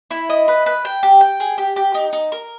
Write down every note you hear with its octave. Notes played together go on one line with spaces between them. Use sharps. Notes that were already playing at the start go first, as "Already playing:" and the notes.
E4
D#5
B4
B4
G5
G4
G5
G#4
G4
G4
D#4
D#4
A#4